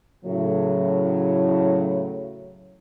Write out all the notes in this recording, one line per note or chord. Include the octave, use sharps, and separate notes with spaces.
A2 C#3 F#3